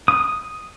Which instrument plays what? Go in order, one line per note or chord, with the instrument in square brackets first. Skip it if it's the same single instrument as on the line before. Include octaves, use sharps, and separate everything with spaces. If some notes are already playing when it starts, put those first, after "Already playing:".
[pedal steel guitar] D#6